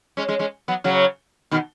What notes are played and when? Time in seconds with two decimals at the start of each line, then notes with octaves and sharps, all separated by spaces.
0.17 G#3 C#4
0.28 G#3 C#4
0.39 G#3 C#4
0.68 F#3 B3
0.84 C#3 F#3
1.51 B2 D#3